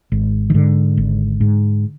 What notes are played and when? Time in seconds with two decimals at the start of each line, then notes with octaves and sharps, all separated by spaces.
0.12 G#1
0.50 D#3
0.54 G#2 D3
0.97 G#1
1.40 G#2